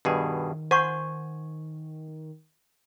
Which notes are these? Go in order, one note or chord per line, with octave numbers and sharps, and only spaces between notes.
G2 B2 D#3 G#4
C5 F#5 G#5 C#6